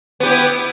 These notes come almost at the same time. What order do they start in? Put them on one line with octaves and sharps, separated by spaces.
B3 G4 E4